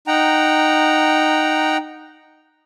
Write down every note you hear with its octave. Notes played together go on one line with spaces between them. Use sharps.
D#4 F#5 G5 A#5